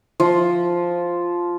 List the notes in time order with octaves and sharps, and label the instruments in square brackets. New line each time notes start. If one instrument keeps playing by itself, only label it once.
[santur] F3